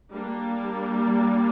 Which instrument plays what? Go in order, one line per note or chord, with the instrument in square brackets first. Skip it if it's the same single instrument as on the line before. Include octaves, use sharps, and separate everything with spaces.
[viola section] G3 A#3 D4